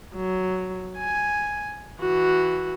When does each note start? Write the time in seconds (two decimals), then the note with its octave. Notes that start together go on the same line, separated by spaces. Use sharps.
0.16 F#3
0.98 G#5
2.01 E3 F#4